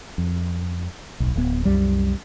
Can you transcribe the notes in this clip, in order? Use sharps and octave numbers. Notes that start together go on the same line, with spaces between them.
F2
D1 B1
D1 B3
C2 F#2 G3